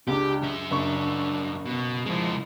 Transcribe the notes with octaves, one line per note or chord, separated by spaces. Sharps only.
C#2 D4 G4
F#2 E5
F#1 D4 C#6
B2
F3 G#3 E4